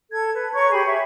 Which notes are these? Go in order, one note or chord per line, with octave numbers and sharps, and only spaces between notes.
A4 G#6
B4
C#5 A#5 C#6 G#6
G4 G#4 B5
E5